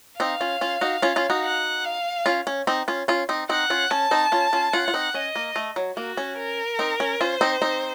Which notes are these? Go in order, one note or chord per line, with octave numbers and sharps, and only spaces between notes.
C4 D#4 F5
C#4 F4
C#4 F4
D#4 F#4
C#4 F4
C#4 F4
D#4 F#4
F#5
F5
C#4 F4
C#4
C4 D#4
C#4 F4
C#4 F4
C4 D#4
C4 D#4 F#5
C#4 F4
C#4 A5
C4 D#4
C#4 F4
C#4 F4
C#4 F4 F#5
F4
C4 D#4
C#4 D#5
A#3
A3
F#3
A#3 F#4
C#4
A#4
C4 D#4
C#4
C#4 F4 C5
C4 D#4
C4 D#4